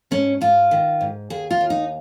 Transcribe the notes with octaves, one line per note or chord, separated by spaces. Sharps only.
G#2 C#4
G#2 F4
D#3
G#2
D#2 G#4
F4
D#2
D#4